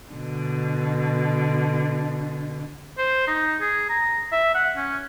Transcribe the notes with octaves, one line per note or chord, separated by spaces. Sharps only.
B2 D3
C5
D#4
G#4
A#5
E5
F#5
C#4